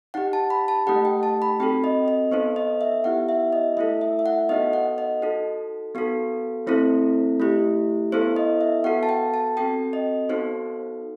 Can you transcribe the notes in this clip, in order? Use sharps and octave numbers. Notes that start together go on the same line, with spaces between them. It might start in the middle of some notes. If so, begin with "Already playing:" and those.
D#4 G4 F#5
A5
B5
A5
A3 D#4 G4 F#5
G5
A5
B5
C4 F#4 A4 G5
D#5
D#5
B3 D#4 A4 C5
D#5
E5
B3 E4 G4 F#5
E5
D#5
A3 E4 A4 E5
E5
E5
F#5
B3 D#4 F#4 A4 D#5
F#5
D#5
D#4 F#4 A4
B3 F#4 A4
A3 C4 E4 A4 C5
A3 E4 G4
B3 E4 A4 C5
D#5
E5
B3 F#4 A4 F#5
A5
G5
A5
C4 F#4 A4 G5
D#5
B3 D#4 F#4 A4 C5